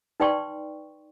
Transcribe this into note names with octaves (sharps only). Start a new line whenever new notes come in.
D#4 B4 D5 G5 C6 C#6